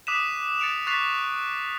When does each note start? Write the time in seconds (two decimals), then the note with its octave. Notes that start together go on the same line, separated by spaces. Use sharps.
0.07 D6 D#6 F#6 B6 D#7 E7
0.60 A6 C#7 D7 F7
0.87 C#6 F#6 A6 B6 C7 F7